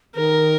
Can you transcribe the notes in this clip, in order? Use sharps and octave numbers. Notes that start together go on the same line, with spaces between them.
D#3 A#4